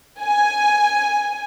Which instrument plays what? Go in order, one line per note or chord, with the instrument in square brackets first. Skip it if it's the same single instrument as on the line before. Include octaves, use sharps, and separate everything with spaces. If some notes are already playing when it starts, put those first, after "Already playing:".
[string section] G#5